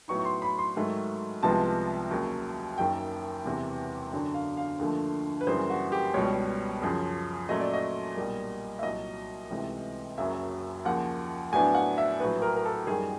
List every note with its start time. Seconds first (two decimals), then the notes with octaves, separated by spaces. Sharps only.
0.08 A2 F#3 B3 D#4 C#6
0.19 C#6
0.25 C6
0.42 B5
0.58 C6
0.76 G#2 D#3 F#3 A3
1.43 C2 C3 F3 G#3 B3 A5
2.11 D#2 C#3 F#3
2.78 F#1 F#2 D#3 G5
3.44 E1 E2 C3 E3
4.13 F#2 D3 F#3
4.34 F5
4.57 F5
4.79 D#2 D3 F3 A3
5.41 B4
5.47 F#2 C#3 E3 G3 A#3 C5
5.70 F#4
5.92 G4
6.14 C#2 B2 G3 C#5
6.82 F#2 C#3 F3
7.49 A#2 F#3 A3 C#4 D#5
7.60 D5
7.73 D#5
8.16 B1 A#2 G3 A#3
8.79 E5
8.83 C2 A#2 F#3 D#5
9.50 C#2 C3 E3 A3
10.18 F#1 F#2 C#3 F#3 E5
10.85 D#2 C#3 F3 F#5
11.52 A2 F#3 B3 D4 G#5
11.75 F#5
11.98 E5
12.20 A#1 A2 F#3 B4
12.42 A#4
12.56 A#4
12.65 A4
12.87 F#2 D#3 G3 A#3 G#4